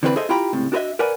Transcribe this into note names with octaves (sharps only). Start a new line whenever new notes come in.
D3 E3 C4 D4 F4 B4
G#4 A4 C5 D#5 E5
E4 F4 G4 G5 A#5 B5
C#2 A2 C3
D4 F#4 A4 B4 D#5 E5
A#4 B4 D5 F#5 G#5